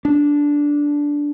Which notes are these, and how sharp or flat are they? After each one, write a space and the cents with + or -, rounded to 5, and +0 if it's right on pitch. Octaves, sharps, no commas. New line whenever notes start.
D4 -10